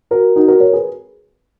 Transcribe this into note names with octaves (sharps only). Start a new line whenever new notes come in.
F#4 A#4
D#4 F#4
F#4 A#4
A#4 C#5
G#4 B4